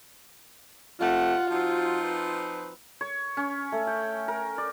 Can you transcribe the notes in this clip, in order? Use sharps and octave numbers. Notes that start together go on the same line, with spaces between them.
F2 C3 A3 F4 F#5
F3 C4 D#4 F#4
B4
C#5
C#4
A3
G5
A#4
D5